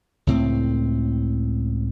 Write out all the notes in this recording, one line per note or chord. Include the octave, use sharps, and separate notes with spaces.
C#2 A2 C4